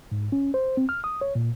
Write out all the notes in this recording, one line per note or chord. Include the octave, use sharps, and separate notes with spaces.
G#2
C#4
C5
C4
F6
D#6
C#5
A#2